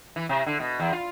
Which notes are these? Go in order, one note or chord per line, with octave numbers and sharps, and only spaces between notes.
E3
C3
D3
B2
E2
F4